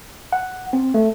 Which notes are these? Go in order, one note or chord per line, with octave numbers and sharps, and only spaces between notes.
F#5
C4
A3